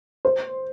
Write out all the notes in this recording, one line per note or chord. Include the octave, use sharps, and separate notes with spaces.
C5